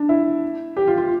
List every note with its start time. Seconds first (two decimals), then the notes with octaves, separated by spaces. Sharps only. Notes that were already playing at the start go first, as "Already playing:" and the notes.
Already playing: D4
0.09 E4
0.77 G4
0.87 F4
0.97 F4